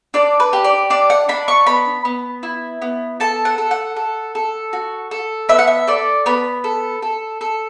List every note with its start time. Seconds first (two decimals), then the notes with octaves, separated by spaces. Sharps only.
0.14 D4 D5
0.40 B4
0.53 G4
0.64 D5
0.90 D4 D5
1.10 F#5
1.29 D4 B5
1.48 C#6
1.67 B3 B5
2.05 B3
2.43 E4
2.82 B3
3.20 A4 A5
3.45 F#5
3.58 A4
3.71 F#5
3.96 A4
4.35 A4
4.73 F#4
5.11 A4
5.49 B3 E5
5.59 F#5
5.67 E5
5.87 A4 D5
6.26 B3 B5
6.64 A4
7.02 A4
7.41 A4